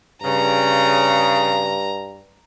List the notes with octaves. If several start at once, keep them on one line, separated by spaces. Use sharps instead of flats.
G2 C#3 A#5